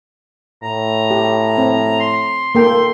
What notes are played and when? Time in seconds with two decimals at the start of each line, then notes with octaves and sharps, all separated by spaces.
0.63 A2 A#5
1.11 G4
1.58 C4
2.00 C6
2.55 A#3 A4 G5 C6